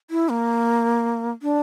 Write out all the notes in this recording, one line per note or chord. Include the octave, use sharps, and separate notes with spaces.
E4
A#3
D4